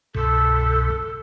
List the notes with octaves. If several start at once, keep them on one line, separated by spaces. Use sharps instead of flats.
C2 G2 B2 A4